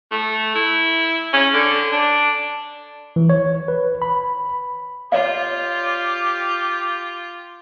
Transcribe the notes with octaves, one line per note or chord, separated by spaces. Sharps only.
A3
E4
C#4
D3
D4
E3
C#5
B4
B5
F4 G4 C#5 D5 F5